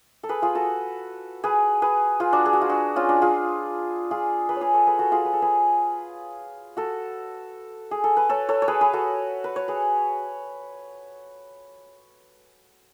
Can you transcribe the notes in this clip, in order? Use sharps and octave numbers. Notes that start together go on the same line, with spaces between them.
A4
G#4 B4
F4 G#4
F#4 A4
G#4 B4
G#4 B4
F4 G#4
D4 F#4
G#4
F#4
F4
D4 F#4
C#4 F4
D4 F#4
F4 G#4
F4 G#4
G#4 B4
C#5
G#4 B4
A4 C#5
G#4 B4
F#4 A4
F4 G#4
B4
A4
G#4 B4
F#4 A4
G#4
A4
B4
A4 C#5
A4 C#5
C#5
G#4 B4
G#4 B4
F#4 A4
B4
C#5
G#4 B4